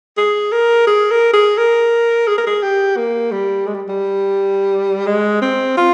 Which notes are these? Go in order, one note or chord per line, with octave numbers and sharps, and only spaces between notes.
G#4
A#4
G#4
A#4
G#4
A#4
G#4
A#4
G#4
G4
A#3
G3
G#3
G3
G3
G#3
C4
F4